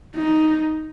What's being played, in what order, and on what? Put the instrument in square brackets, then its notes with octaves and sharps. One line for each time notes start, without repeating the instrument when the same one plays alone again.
[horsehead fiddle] D#4